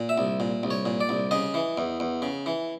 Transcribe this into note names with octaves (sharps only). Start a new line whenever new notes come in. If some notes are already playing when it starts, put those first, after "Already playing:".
Already playing: A#2
E5
C2
A#2
C2
C#5
A#2
D5
C2
C#3 D#5
E3
E2
E2
C#3
E3